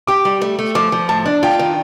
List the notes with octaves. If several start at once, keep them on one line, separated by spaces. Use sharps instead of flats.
G4 D6
G3
A3
A3
F3 D6
F3
A2 A5
D4
F4 G5
D#3